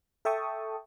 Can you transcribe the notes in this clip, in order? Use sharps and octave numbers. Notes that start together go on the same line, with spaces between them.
A4 E5 G5 A5 C#6 D#6